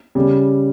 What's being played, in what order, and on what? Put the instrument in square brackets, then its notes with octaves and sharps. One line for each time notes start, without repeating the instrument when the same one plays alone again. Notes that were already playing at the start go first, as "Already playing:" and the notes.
[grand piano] C#3 G3